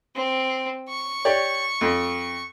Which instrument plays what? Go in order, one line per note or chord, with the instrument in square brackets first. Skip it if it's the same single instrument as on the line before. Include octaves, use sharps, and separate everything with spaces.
[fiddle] C4
C#6
[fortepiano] G4 C#5 D5
F2